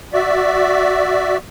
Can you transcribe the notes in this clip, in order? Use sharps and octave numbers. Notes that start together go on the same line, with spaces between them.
F#4 D5 E5